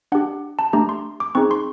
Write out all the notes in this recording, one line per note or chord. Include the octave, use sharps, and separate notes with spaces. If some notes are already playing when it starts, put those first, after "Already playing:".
D4 G4 F#5
A5
A3 D4 G4 A#5
C6
D6
C4 D#4 G#4 C#6
C6